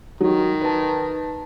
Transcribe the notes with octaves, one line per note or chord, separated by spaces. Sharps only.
D#3 F#3
B4 A5